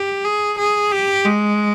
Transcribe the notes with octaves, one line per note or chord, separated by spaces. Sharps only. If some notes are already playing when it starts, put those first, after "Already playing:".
Already playing: G4
G#4
G#4
G4
G#3